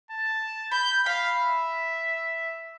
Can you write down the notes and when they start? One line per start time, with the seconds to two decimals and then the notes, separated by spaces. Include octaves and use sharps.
0.11 A5
0.71 B5 G6
1.06 F5 B5
1.41 E5